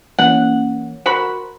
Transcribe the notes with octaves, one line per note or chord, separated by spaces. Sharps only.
E3 A#3 C#4 F#5
F#4 A#4 C5 B5